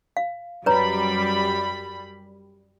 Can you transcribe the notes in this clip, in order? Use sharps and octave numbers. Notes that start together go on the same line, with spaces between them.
F5
F#2 G3 B4 C#5 A#5 B5